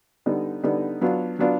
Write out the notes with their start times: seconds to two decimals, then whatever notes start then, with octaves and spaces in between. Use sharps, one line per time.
0.26 D3 G3 B3 D#4
0.64 D3 G3 B3 D#4
1.01 F#3 B3 D4 F4
1.39 F#3 B3 D4 F4